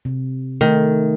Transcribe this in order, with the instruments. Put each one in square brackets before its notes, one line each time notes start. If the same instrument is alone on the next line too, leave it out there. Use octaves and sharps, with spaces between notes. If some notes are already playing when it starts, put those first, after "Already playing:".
[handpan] C3
[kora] D#3 [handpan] A3